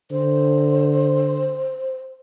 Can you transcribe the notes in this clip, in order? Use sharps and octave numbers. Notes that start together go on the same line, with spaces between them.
D3 C5